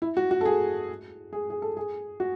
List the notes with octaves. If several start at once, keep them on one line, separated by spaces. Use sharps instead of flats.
E4
F#4
F#4
A4
G#4
G#4
G#4
A4
G#4
F#4